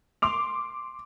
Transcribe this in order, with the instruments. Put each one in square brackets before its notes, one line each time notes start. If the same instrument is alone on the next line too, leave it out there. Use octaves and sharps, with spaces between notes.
[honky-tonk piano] C6 D6 F7